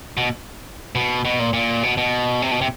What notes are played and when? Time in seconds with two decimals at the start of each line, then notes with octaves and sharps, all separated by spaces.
0.17 B2
0.95 B2
1.25 B2
1.39 A#2
1.53 A#2
1.83 B2
1.97 B2
2.42 C3
2.51 B2
2.61 C3